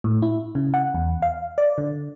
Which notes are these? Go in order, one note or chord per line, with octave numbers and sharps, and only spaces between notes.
A2
E4
C#3
F#5
E2
F5
D5
D3